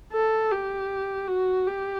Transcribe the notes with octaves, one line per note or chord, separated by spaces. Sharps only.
A4
G4
F#4
G4